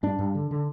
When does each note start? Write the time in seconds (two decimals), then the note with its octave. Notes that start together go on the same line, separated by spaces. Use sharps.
0.03 G2 D4
0.19 G2
0.35 D3
0.51 D3